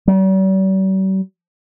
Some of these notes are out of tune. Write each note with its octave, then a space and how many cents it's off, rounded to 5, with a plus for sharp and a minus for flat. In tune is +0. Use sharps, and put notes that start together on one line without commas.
G3 -45